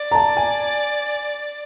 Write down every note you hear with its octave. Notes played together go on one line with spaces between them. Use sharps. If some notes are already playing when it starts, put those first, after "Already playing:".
Already playing: D5
A#5
A5
G#5